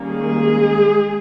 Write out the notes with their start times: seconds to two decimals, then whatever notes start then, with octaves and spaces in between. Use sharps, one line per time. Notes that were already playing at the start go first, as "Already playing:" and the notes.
Already playing: D#3 G3 A#3 C#4
0.10 G#3 G#4